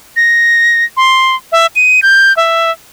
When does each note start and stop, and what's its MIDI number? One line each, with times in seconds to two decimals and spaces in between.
0.17 0.85 94
0.97 1.36 84
1.52 1.66 76
1.76 2.00 99
2.03 2.35 91
2.37 2.71 76